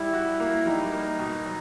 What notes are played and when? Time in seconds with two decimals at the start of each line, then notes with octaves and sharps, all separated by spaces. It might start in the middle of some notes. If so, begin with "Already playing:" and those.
Already playing: G3 E4
0.13 F#4
0.40 A#3
0.66 G3 D#4
0.92 A#3
1.19 B2
1.46 F#3